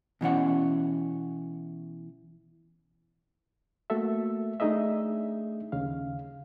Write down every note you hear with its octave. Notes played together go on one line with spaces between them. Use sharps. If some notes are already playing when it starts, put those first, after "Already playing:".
B2 E3 C#4 F#5
A3 A#3 F#4 A4 E5
A3 D4 D#4 G#4 D#5 E5
D#2 C#3 F5